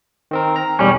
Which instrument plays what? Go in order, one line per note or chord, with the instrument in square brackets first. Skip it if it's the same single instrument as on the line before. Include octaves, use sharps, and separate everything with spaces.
[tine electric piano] D#3 C4 A#4
A#5
[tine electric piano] B1 E2 [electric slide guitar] G3 C#4